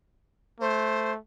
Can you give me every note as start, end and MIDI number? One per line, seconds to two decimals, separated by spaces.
0.61 1.18 57
0.61 1.12 72